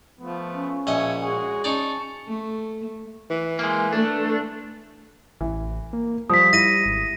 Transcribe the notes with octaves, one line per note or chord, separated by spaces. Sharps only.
F3 A3 B3
C#4
A#1 D#5 E5 G#5 C#6
G#3 F#4 G#4 C#5
C#4 D#4 D5 A5 C#6
A3
E3
G#3 A#3
A3 D4
A1 E3
A#3
F3 G3 D#6 B6
E4 A#6 D#7
G#1